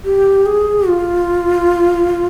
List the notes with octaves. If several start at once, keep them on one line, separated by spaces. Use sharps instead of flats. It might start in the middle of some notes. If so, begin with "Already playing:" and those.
G4
G#4
F4